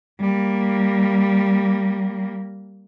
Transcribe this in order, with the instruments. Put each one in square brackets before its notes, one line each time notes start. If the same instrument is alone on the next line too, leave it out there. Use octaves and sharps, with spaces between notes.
[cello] G3 A#3